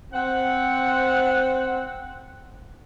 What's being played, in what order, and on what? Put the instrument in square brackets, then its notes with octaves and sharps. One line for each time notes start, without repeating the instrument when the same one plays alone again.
[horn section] C4 F#5